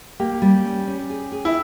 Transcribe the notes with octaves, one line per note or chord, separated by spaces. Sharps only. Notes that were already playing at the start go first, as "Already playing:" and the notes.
A#3 G4
G3
C#4
C#4
G#4
G#4
E4